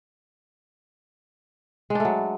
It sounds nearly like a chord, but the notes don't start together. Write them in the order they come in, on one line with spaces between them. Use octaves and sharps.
G#3 D4 A3 F#3